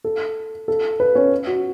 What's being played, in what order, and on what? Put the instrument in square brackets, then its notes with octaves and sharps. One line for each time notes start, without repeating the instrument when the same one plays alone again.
[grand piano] A4
A4
B4
C#4
F#4